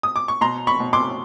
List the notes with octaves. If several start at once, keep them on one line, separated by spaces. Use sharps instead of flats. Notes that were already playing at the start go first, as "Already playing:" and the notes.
D#6
D6
C#6
B2 A#5 C6
B5 C#6
B2
C6 D6